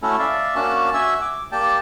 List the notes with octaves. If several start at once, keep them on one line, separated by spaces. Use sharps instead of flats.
A3 C#4 E4 F#4 A4
D5 E5 F5
A#3 C#4 D4 F#4 A5
F#4 E5 G#5 E6
D6
A#3 G4 D5 G5 A5